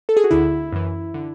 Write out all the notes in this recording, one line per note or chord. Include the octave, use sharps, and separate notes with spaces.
A4
G#4
F#4
D2 D3 E4
F#2 E3
D3